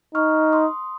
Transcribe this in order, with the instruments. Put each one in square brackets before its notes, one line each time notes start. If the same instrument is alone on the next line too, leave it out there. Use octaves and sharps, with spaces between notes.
[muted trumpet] D#4 [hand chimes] C#6 F6
[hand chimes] C6 D#6